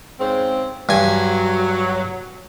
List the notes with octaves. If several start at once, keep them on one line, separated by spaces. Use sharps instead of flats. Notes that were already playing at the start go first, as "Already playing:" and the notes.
G#2 C#3 C4
G2 F#3 G#5